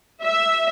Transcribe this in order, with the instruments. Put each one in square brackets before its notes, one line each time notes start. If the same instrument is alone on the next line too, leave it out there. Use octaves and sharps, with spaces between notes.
[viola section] E5